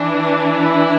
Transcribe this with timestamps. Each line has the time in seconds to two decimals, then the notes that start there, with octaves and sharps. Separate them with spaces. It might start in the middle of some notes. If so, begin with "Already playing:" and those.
Already playing: E3 D4
0.45 E4